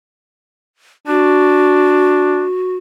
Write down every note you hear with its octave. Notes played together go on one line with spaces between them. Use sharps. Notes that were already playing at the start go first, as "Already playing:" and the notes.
D4 F#4